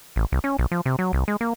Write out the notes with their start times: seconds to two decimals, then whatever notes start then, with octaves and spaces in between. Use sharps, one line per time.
0.16 A1
0.32 C2
0.44 C#4
0.59 B1
0.72 F3
0.86 C3
0.99 F#3
1.13 C2
1.28 G#3
1.41 A#3